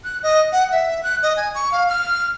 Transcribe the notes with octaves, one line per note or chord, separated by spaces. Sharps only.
F#6
D#5
F#5
E5
F#6
D#5
G#5
C#6
F5
F6